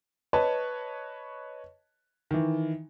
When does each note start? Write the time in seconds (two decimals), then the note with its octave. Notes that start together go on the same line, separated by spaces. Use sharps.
0.33 B4 C#5 D#5 A5
2.31 D#3 E3